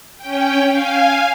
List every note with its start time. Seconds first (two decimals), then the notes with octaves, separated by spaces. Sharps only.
0.17 C#4 G5
0.69 F5 G#5